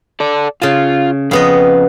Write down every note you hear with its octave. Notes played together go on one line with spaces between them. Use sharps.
A4 D5
C#3 F4 A5
F2 C#3 B3 D#5